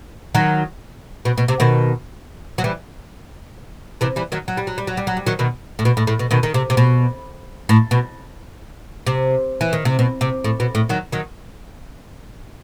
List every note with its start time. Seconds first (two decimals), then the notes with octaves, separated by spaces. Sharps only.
0.35 D#3 F#3
1.25 B2
1.38 B2
1.48 C3
1.60 B2 D#3
2.58 F#3
2.64 E3 G3
4.01 C3 E3
4.16 E3 G3
4.32 D#3 F#3
4.48 F#3
4.57 G3
4.67 F#3
4.78 G3
4.87 F#3
4.97 G3
5.07 F#3
5.17 G3
5.26 D#3 F#3
5.39 B2 D#3
5.79 A2
5.85 B2
5.97 A2
6.07 A2
6.19 B2
6.31 B2 D#3
6.43 D#3
6.54 C3
6.70 C3
6.77 B2
7.69 A2
7.91 B2
9.07 C3
9.61 E3
9.73 D#3
9.85 C3
9.99 B2
10.21 C3
10.44 A2
10.60 B2
10.75 A2
10.89 D#3 F#3
11.12 D#3 F#3